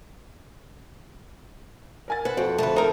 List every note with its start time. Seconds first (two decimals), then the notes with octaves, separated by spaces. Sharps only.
2.08 A#4 G#5 A6
2.25 B4 C5 F#5
2.37 F2 C4 F#4 C5
2.58 D2 A3 B4 A5
2.76 D#4 A4 A#4 C5